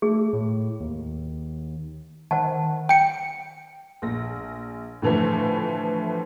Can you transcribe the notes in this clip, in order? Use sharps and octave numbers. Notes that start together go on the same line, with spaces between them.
A3 G#4
A2
D#2
D#3 C5 F#5 A5
G5 C#7
A#1 A#6
A2 D3 E3 F3 A3